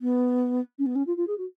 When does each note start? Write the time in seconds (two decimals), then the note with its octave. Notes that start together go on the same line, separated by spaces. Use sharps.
0.01 B3
0.79 C#4
0.86 B3
0.95 C#4
1.07 F4
1.17 F4
1.27 G#4
1.38 F#4